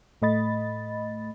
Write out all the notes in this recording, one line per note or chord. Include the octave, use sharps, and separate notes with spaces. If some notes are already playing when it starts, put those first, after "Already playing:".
A2 A3 D#5 B5 A6